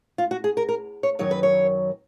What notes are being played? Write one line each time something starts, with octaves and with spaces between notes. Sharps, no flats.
F4
F#4
G#4
A#4
A#4
C#5
F#2 D#3 F#3 C#5
B4
C#5